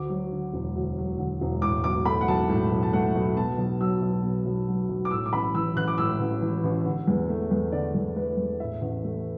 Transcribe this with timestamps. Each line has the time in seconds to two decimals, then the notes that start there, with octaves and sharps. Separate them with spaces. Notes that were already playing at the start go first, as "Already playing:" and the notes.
Already playing: D2 D6
0.09 F#3
0.32 D3
0.53 E1
0.76 D2
0.98 F#3
1.18 D3
1.41 E1
1.62 A2 D6
1.84 B1 D6
2.05 A3 B5
2.21 F#5
2.28 B1 A5
2.49 A2
2.71 B1
2.83 A5
2.93 A3 F#5
3.15 B1
3.37 B2 A5
3.58 B1
3.80 F#3 E6
4.02 B1
4.24 B2
4.46 B1
4.67 F#3
4.89 B1
5.05 D6
5.10 A2 E6
5.26 D6
5.33 A1 B5
5.55 E3 E6
5.76 A1 F#6
5.88 D6
5.98 A2 E6
6.20 A1
6.42 E3
6.63 A1
6.85 D3
7.08 E2
7.29 A3
7.51 E2
7.72 D3 D5
7.95 E2
8.16 A3 B4
8.37 E2
8.60 A2 E5
8.81 A1
9.04 A3